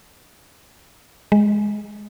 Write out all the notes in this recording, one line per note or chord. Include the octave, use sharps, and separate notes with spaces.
G#3